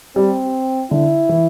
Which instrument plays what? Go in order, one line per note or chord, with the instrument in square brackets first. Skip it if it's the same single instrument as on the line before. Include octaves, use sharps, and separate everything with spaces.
[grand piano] G3 [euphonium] C4
[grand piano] D3 [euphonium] E4
[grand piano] E3